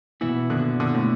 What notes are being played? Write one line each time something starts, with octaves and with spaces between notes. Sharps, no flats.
B2 E3 B3 E4
D3
D3
A2